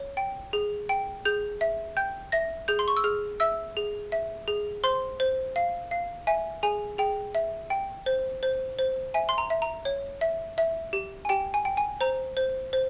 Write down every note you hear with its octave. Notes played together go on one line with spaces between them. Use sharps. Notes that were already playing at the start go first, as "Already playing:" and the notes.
Already playing: C#5
G5
G#4
G5
G#4 G6
E5
G5 G6
E5 A#6
G#4 G6
C6
C#6
E6
G#4 F6
E5 E6
G#4
E5
G#4
C5 C6
C5
F5
F5
E5 G#5
G#4 G#5
G#4 G5
E5
G5
C5
C5
C5
E5 G#5
C6
A#5
E5
A#5
C#5
E5
E5
G4
G#5
G4 G5
G#5
G5
G#5
C5 A#5
C5
C5